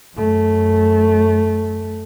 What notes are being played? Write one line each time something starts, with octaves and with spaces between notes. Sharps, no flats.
F#2 A3